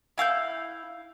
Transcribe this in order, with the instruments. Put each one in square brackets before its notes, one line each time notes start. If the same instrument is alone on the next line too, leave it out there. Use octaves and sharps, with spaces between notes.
[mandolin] E4 F5 E6 G6